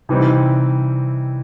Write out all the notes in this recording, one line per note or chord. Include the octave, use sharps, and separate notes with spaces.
C3 E3 G3 C4 D#4